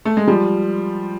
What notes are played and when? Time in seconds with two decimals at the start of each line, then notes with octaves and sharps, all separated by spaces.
0.05 A3
0.17 G#3
0.27 F3 G3